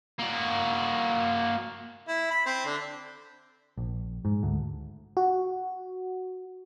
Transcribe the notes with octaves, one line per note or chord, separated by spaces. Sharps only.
A#3 F#4
E4
B5
C4
D3
A#1
G#2
D2
F#4